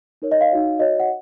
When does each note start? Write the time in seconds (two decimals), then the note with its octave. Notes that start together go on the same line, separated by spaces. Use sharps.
0.22 D#4 A#4 C#5
0.32 D#5
0.41 F5
0.51 D#4 F#4 C#5
0.79 F#4 C#5 D#5
1.00 F#5